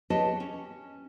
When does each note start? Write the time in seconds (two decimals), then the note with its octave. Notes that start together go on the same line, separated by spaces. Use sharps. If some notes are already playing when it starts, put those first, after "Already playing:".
0.10 G4 G#4 B4 C#5 D#5 A5
0.40 C#4